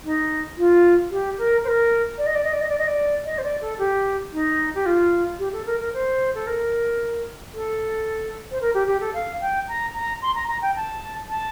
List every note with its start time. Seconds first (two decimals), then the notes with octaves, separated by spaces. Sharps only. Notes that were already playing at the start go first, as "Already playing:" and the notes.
0.04 D#4
0.57 F4
1.11 G4
1.38 A#4
1.64 C5
1.68 A#4
2.18 D5
2.26 D#5
2.35 D5
2.44 D#5
2.53 D5
2.61 D#5
2.69 D5
2.78 D#5
2.87 D5
3.25 D#5
3.38 C5
3.43 D5
3.61 A4
3.79 G4
4.32 D#4
4.75 G4
4.86 F4
5.39 G4
5.53 A4
5.66 A#4
5.80 A#4
5.93 C5
6.35 A4
6.47 A#4
7.54 A4
8.51 C5
8.61 A#4
8.74 G4
8.87 G4
9.01 A4
9.14 F5
9.41 G5
9.68 A#5
9.95 A#5
10.22 C6
10.35 A#5
10.48 A#5
10.62 G5
10.76 A5
11.29 A5